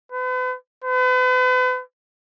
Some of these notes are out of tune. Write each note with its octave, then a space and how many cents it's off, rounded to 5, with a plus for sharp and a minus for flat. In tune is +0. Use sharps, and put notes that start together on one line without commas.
B4 +40
B4 +40